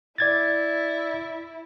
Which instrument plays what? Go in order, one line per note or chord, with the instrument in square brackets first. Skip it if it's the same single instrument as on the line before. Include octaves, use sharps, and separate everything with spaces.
[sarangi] E4 [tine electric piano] D5 G#6 A6